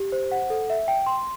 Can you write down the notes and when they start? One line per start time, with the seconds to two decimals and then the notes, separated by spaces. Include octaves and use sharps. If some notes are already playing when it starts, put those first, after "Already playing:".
Already playing: G4
0.12 C5
0.32 F#5
0.50 A4
0.70 E5
0.88 G5
1.06 C6